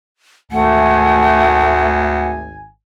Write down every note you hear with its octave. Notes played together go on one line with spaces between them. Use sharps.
G#1 D2 A3 F#5 G#5